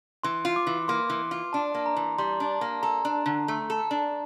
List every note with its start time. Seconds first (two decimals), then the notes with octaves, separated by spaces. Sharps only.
0.24 E3 C6
0.45 F4
0.56 D6
0.67 E3
0.88 A#3 C6
1.10 E3
1.31 F4
1.53 D4 A5
1.75 A#3
1.86 A#5
1.96 E3
2.18 G3 C6
2.40 D4
2.61 A#3
2.83 A4 A#5
3.05 D4
3.26 D3
3.48 A3
3.70 A4
3.91 D4